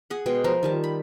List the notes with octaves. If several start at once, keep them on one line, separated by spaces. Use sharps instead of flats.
G#4 F#5
B2 G#3 G5
F3 F4 A#4
D#3 G3 A5
B5